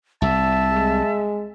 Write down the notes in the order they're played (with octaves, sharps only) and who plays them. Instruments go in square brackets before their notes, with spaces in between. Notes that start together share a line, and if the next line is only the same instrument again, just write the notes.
[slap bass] C2 [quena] E5 [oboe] A5
[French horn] G#3